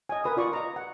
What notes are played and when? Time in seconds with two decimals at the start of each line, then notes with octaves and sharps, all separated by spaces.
0.09 D#5 G#5
0.24 A#4 B4 D#6
0.37 F4 D5 C#6
0.53 D#5 A#5
0.76 F#5